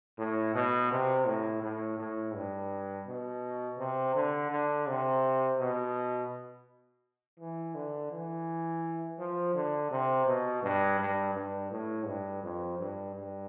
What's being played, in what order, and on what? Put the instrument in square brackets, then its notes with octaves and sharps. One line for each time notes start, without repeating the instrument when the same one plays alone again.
[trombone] A2
B2
C3
A2
A2
A2
G2
B2
C3
D3
D3
C3
B2
E3
D3
E3
F3
D3
C3
B2
G2
G2
G2
A2
G2
F2
G2
G2